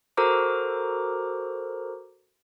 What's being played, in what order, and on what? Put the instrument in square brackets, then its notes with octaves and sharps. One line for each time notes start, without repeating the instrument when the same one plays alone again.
[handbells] F#4 A4 A#4 C5 A#5 D6